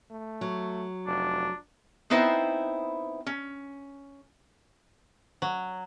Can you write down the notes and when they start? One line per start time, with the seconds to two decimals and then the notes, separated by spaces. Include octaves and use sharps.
0.11 A3
0.41 F#3
1.06 F1 D4
2.10 B3 C4 D#4 E4 B4 C5
3.26 C#4
5.42 F#3